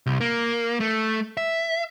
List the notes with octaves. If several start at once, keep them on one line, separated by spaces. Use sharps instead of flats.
C2
A#3
A3
E5